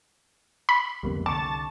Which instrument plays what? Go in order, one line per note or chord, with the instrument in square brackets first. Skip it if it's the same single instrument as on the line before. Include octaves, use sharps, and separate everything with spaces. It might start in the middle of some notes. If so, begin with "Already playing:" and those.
[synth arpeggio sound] B5
[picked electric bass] C2 F2 D3 [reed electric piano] G3 A#3 B3
[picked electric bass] C2 D3 [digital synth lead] A5 [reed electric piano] C#6 D6